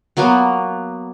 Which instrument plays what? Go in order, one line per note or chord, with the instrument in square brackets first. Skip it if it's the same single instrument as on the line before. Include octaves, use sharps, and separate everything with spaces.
[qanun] F#3 A#3 B3 F#4